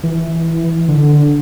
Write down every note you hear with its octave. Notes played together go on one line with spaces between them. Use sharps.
E3
D3